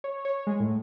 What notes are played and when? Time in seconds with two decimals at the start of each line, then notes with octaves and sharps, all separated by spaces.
0.04 C#5
0.25 C#5
0.47 G#3
0.60 A2